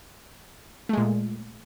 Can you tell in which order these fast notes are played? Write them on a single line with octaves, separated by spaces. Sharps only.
A3 G#3 A#2